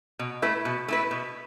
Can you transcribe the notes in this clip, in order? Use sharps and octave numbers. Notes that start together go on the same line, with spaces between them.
B2
A3 E4 B4
B2
A3 E4 B4
B2